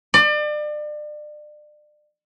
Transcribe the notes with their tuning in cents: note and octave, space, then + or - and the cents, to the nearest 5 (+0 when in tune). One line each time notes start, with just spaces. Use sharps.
D5 +35